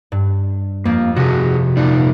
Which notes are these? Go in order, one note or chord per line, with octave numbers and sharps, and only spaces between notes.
G2
F2 A#3
C3 F#4 G#4
A#2 D#4 D5